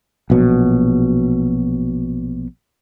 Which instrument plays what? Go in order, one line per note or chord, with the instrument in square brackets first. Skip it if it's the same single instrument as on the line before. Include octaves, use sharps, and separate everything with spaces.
[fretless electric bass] A#1 B2 F#3